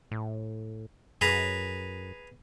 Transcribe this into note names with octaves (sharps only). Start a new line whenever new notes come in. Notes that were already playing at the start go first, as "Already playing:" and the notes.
A2
F#2 G#4 B4 A#5